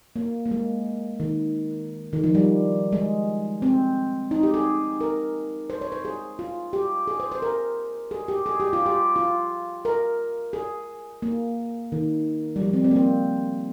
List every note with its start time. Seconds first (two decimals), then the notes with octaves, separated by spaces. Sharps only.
0.16 A#3
0.46 A#3
0.51 G#3
1.20 D#3
2.13 D#3
2.24 F3
2.35 G3
2.92 G#3
3.62 C4
4.31 D#4
4.43 G4
4.54 G#4
5.01 A#4
5.70 C5
5.81 C#5
5.92 C5
6.05 G#4
6.39 F4
6.73 G4
7.08 G#4
7.20 C5
7.32 C5
7.42 A#4
8.11 G#4
8.28 G4
8.46 G#4
8.60 G4
8.73 F4
8.86 G4
9.16 F4
9.85 A#4
10.53 G#4
11.22 A#3
11.92 D#3
12.56 G3
12.62 F3
12.73 C4
12.84 C4
12.91 A#3
12.96 C4